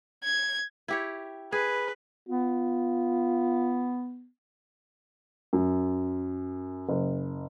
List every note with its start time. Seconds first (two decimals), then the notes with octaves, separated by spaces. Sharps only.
0.23 G#6
0.88 E4 G4 C#5
1.52 G#4 B4
2.29 B3 F4
5.53 F#2
6.89 F#1